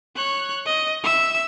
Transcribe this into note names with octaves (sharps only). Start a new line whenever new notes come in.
C#5 F#6
D#5
E5 E6